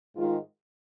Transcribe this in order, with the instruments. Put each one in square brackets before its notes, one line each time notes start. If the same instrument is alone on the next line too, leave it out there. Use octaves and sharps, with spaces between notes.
[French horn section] G#2 D#3 G#3 F4